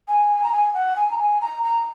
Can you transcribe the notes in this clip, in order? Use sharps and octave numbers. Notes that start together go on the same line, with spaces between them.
G#5
A#5
G#5
F#5
G#5
A#5
G#5
A#5
A#5